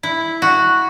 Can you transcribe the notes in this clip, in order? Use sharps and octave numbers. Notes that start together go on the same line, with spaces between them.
E4
F#4